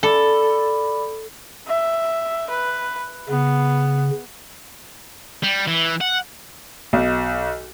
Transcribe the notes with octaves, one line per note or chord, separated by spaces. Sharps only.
A4 D5 B5 D6
E5
B4
C#3 B3
G3
E3
F#5
B1